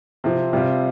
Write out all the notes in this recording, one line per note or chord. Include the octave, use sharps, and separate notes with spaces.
C3 F3 C4
C3 G3 C4 F4